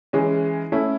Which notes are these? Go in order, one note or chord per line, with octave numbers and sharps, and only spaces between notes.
E3 G#3 C#4
A3 C#4 E4